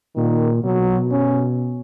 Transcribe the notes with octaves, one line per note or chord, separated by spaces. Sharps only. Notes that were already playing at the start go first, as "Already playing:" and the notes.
A#2 D#3
B2 F#3
C#4